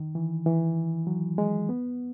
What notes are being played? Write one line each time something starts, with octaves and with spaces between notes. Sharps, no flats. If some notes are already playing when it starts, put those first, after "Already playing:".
Already playing: D#3
E3
E3
F#3
G#3
B3